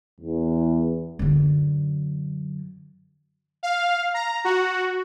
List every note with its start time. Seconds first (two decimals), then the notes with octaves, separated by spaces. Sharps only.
0.20 E2
1.19 F#2 D3
3.63 F5
4.14 A#5
4.45 F#4